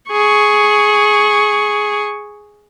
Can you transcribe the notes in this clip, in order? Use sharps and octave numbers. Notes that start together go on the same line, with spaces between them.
G#4 C#6